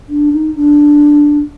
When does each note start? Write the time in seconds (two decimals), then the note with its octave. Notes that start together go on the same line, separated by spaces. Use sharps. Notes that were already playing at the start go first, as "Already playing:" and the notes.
0.09 D4
0.33 D#4
0.55 D4